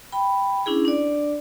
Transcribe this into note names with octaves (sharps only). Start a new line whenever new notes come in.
G5 B5
C#4 D4 E4 G#4
D4 D5